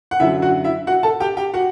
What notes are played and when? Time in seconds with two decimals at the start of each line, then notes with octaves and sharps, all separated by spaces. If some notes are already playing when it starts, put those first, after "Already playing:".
0.11 F#5
0.20 F#2 D3 F#3 E4 E5
0.42 F#4 F#5
0.64 E4 E5
0.87 F#4 F#5
1.03 A4 A5
1.20 G4 G5
1.37 G4 G5
1.54 F#4 F#5